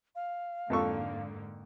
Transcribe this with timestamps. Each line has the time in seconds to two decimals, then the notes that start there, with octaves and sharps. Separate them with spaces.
0.16 F5
0.70 F2 G#2 D3 A#3 A4 C#6